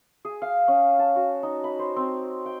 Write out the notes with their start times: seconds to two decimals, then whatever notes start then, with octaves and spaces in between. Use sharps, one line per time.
0.25 G#4
0.42 F5
0.68 C#4
0.99 A5
1.16 F#4
1.43 D#4
1.64 B5
1.79 C5
1.96 C4
2.46 G5